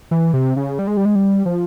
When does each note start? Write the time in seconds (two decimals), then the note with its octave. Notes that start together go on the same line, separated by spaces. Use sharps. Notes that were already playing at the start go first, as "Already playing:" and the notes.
0.11 E3
0.34 C3
0.56 C#3
0.79 G3
0.87 G#3
0.97 G3
1.05 G#3
1.15 G3
1.46 F3